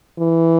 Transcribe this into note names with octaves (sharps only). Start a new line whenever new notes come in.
E3